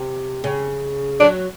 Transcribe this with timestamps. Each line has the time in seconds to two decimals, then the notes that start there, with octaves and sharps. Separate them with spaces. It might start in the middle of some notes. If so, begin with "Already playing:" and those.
Already playing: C3
0.44 C#3
1.20 F#3 D4